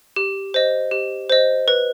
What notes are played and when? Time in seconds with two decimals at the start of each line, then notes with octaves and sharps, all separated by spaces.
0.16 G4
0.54 C5 D#5
0.91 G4
1.30 C5 D#5
1.68 B4